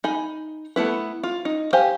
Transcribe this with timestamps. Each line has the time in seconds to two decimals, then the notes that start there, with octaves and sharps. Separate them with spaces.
0.04 D#4 G#5 B5
0.76 A3 B3 E4 B4
1.23 F4
1.45 D#4
1.73 G4 C5 F5 G#5